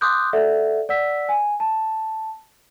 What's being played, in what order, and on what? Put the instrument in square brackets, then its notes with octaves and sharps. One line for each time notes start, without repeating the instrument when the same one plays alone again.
[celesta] C6 D6 D#6 F#6 G6
A4 D5 E5 F#5
D5 F#5 E6 B6
G#5
A5